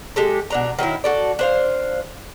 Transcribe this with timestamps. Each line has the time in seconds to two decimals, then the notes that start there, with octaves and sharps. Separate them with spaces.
0.16 G#3 G4 A4
0.50 B2 D4 A#5
0.78 D#3 F#3 C#4 E4
1.04 F#4 A4 D5
1.39 D4 C5 F5